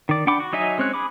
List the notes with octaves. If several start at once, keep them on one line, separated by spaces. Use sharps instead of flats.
D#3 D5
D4 F#5 G5 B5 D6
F#4
F#3 D#4 D#5 E5 G#5
G#3 C4 C#4 C#5 F#6
G#4 B5 D6